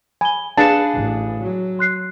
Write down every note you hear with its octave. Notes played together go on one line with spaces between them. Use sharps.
G#5 B5 G7
D4 G#4 B4 F5 A5 C#7
A1
F#3
C6 F#6 C7